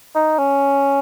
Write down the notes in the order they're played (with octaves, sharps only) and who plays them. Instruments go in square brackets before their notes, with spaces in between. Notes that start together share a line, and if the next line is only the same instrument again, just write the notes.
[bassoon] D#4
C#4